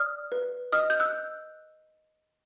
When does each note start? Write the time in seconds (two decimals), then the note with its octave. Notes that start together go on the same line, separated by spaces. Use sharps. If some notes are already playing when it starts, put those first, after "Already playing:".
Already playing: D5 D#6 F6
0.32 B4
0.72 D#5 D#6 F6
0.90 G6
1.00 E6 F#6